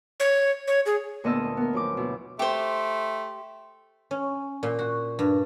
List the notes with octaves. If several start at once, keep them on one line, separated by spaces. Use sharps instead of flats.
C#5
C#5
G#4
D2 A#2 B3 D#5 A5 E6
B3 A#4
F#2 F3 D6
B2 E4
A3 G4 C5
C#4
A#2
F#4
G2